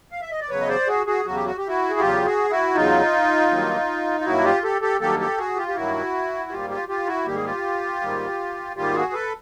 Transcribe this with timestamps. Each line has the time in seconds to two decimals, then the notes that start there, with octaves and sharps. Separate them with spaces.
0.11 F5
0.21 E5
0.31 D#5
0.40 D5
0.49 E2 C#3 F#3 B4 C#5
0.61 D#5
0.68 C5 D5
0.87 F#4 G#4
1.06 F#4 G#4
1.25 E2 C#3 F#3 F#4
1.35 G4
1.46 F#4
1.57 G4
1.67 E4 F#4
1.90 G#4
2.00 E2 C#3 F#3 F4 G4
2.25 F#4 G#4
2.50 E4 F#4
2.75 E2 C#3 F#3 D#4 F4
3.51 G2 D#3 F#3 A#3
4.20 F4
4.25 G2 D#3 F#3 A#3 E4 F#4
4.44 F4 G4
4.63 G4 A4
4.81 G4 A4
5.00 G2 D#3 F#3 A#3 G4 A4
5.19 G4 A4
5.38 F#4 G#4
5.56 F4 G4
5.68 G4
5.75 G2 D#3 F#3 A#3 E4 F#4
6.50 G#2 D#3 G3 A#3 F4 G4
6.70 F4 G4
6.88 F4 G4
7.07 E4 F#4
7.25 G#2 D#3 G3 A#3 G4
7.36 G#4
7.44 F4 G4
8.01 G#2 D#3 G3 A#3
8.76 G#2 D#3 G3 A#3 F4 G4
8.94 F#4 G#4
9.13 A4 B4